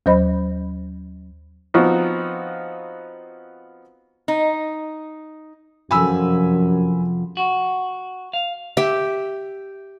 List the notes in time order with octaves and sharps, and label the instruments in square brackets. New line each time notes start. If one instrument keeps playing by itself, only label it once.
[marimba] D#2 F#3 C5 D#5 B5
[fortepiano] F3 B3 C4 D#4 F4 F#4
[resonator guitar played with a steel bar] D#4
[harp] F1 F3 [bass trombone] F#2 [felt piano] G#5 B5 E6
[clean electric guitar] F#4
F5
[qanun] G4 E5